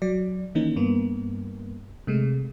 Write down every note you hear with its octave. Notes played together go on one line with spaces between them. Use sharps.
F#3 D5
D#3 E3 A#3 C#4 D#4
G2 A#3 B3
C3 G#3 A3